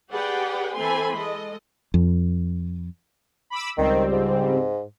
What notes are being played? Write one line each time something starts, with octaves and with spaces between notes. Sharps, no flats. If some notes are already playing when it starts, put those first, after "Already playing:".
G4 G#4 B4 D5 F#5 G5
E3 C4 A4 G#5 B5 C6
G#3 A4 D#5
F2
B5 D6 E6
C#2 D#3 G3 C4
G#2